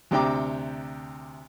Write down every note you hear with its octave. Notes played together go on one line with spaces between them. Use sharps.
D2 C3 D4 G5 A#5 D6